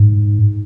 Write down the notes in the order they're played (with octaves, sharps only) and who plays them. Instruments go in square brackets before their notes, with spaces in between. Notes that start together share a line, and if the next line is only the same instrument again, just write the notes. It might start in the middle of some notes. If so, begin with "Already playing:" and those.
Already playing: [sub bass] G#2